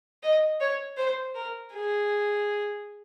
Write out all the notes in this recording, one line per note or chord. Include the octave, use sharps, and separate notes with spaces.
D#5
C#5
C5
A#4
G#4